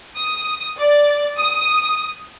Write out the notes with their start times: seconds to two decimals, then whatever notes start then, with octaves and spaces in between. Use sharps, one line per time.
0.17 D#6
0.79 D5
1.39 D#6